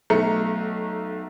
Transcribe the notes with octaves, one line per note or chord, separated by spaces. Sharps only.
B1 A3 A#5 C#7